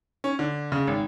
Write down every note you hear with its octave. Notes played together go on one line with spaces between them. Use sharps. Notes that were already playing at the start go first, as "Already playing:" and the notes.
C#4
D3
C#3
G#1